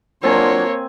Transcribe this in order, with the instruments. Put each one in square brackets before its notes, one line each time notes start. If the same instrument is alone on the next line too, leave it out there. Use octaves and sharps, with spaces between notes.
[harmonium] F#3 D4 F4 [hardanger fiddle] A#3 [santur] C4 G5 G#5 [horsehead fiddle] C#5